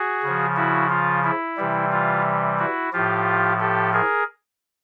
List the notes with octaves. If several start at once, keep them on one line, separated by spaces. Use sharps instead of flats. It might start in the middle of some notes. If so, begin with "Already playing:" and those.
Already playing: F#4 G#4
C#3 F3
E4 F#4
F4
E4
C3 E3 G3
F4
E4 F#4
A2 F3 F4 G4
G4 A4
G#4 A#4